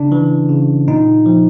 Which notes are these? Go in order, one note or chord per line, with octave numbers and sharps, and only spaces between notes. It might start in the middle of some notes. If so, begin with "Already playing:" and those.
Already playing: C#3 D4
E3
C#3
A#2 D#4
F3